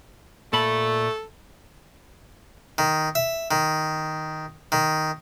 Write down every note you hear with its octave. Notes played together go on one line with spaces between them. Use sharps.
A#2 A3 A4 B5
D#3
E5
D#3
D#3